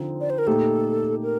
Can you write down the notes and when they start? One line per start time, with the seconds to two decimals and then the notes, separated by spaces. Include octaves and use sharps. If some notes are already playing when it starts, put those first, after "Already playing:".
Already playing: D3 F3 C4 D#4
0.21 D5
0.30 C5
0.38 A#4
0.47 A#2 A3 D#4 G4 A4
1.23 A#4